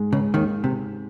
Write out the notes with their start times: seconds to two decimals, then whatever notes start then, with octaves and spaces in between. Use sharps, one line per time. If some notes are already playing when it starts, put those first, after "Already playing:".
Already playing: G#2 G#3
0.12 C#2 C#3
0.34 D#2 D#3
0.64 C3